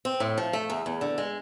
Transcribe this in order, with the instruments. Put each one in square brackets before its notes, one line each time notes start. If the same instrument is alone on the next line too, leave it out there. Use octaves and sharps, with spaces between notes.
[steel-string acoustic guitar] C4
A2
F3
A3
E2
E2
D3
G#3